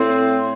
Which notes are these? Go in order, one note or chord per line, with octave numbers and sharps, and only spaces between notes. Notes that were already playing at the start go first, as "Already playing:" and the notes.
Already playing: A2 C4